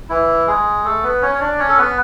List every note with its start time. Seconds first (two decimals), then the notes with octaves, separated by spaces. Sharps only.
0.09 E3 E4
0.47 G#3 G#4
0.85 A3 A4
1.03 B3 B4
1.22 C#4 C#5
1.35 C#5
1.40 D4 D5
1.59 C#4 C#5
1.69 A4
1.78 B3 B4